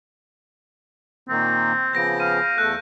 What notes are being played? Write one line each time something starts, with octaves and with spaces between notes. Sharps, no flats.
A#2 D#3 A#3 C4
C#3 F3 B3 G6 A#6 D7
F5 D#7
E2 A3 A4 F#6